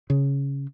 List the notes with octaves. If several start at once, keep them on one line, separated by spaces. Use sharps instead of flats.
C#3